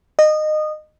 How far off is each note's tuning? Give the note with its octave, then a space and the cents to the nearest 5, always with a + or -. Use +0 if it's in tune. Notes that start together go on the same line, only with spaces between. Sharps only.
D#5 -20